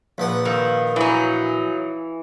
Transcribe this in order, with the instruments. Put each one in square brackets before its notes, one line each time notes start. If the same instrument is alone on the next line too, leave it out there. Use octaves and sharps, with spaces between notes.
[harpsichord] A#1 F3 F#5 [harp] B4
[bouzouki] D#3 [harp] F5 E6
[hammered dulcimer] E3 [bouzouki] F#3 D#4